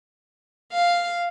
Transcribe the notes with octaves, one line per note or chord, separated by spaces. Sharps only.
F5